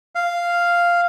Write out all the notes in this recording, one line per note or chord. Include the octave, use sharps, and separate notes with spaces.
F5